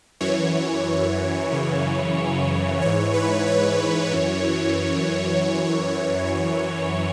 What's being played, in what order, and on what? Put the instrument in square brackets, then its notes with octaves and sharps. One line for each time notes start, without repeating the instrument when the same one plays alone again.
[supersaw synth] F#2 E3 C#5
F#2 C#3 E3
G#2 E3 C#5
B4
C#5
F#2 E3